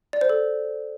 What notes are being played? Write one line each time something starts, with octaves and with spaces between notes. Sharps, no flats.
D5
C5
A4